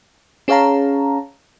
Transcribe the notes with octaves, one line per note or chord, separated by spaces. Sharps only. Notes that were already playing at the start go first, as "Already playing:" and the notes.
C#4 G#4 C#5 F5 A5 A#5